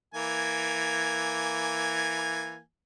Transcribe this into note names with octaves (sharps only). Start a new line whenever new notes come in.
E3 A#3 G#5